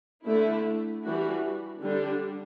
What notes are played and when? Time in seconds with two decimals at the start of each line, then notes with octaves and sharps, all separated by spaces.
0.26 D3 A3 E4
1.04 E3 G3 D4 F#4
1.81 D3 G3 D4